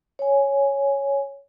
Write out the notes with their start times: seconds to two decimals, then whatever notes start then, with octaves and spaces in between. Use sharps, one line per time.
0.19 C#5 G#5